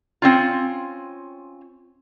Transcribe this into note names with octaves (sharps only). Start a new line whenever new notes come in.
C4 C#4 F4